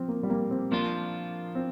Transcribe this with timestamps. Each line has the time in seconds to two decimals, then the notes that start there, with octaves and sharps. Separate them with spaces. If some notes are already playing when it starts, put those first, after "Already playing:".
Already playing: F3 C4
0.08 A#3
0.23 G3
0.30 A#3
0.51 C4
0.71 F3 A#3 D4 F4
1.55 C4